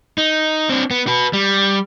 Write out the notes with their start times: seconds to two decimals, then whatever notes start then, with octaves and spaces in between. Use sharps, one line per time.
0.18 D#4
0.69 C4 D4
0.91 B3
1.07 F#4 B4
1.33 G3